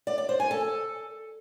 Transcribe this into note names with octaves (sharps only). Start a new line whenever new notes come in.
D5
D5
C5
G#5
A4